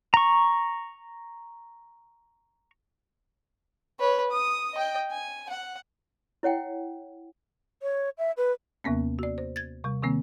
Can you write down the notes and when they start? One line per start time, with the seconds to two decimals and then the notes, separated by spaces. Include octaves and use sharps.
0.14 A#5 C#6
3.99 B4 C#5
4.31 D#6
4.75 D#5 G5
5.11 G#5
5.50 F#5
6.43 E4 C#5 F#5 G5
7.82 C#5
8.18 E5
8.37 B4
8.84 D#2 C3 A#3 B3 C#4
9.19 F#4 D5
9.38 C5
9.56 G#6 A6
9.84 C3 G3
10.03 C3 D#3 A#3 C4